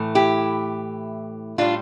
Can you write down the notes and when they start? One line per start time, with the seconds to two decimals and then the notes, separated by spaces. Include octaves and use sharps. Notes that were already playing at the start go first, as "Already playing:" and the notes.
Already playing: A2 E3 A3
0.15 E4 G4
1.58 A2 G3 D4 F4